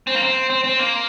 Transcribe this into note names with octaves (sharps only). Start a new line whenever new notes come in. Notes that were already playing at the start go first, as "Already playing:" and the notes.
C4
A#3
C4
C4
C4
A#3